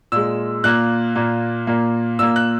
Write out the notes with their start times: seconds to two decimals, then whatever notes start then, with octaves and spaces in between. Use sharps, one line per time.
0.12 A#2 G#3 E6
0.64 A#2 A#3 F#6
1.16 A#2 A#3
1.67 A#2 A#3
2.19 A#2 A#3 E6
2.36 F#6